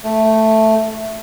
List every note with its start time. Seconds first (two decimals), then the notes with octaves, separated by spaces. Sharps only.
0.04 A3